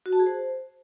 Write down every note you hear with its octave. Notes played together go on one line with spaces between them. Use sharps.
F#4
A5
G#4
C5